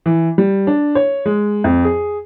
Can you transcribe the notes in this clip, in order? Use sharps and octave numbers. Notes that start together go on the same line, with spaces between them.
E3
G3
D4
C#5
G#3
F2
G#4